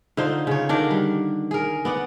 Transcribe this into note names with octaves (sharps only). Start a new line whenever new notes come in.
D3 D#4 F4 C5
C#3 C#5
D3 D#3 D4 A#4
G3
G#4 A#4
B3 D5 F#5